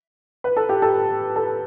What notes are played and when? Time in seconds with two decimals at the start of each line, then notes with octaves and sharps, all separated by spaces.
0.44 B4
0.57 A4
0.69 G4
0.82 A4
1.36 A4